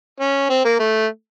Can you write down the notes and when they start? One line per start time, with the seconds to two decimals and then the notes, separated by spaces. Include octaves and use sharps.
0.20 C#4
0.49 C4
0.64 A#3
0.79 A3